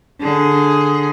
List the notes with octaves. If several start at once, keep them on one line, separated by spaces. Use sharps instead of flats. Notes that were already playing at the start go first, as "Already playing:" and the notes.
D3 G#4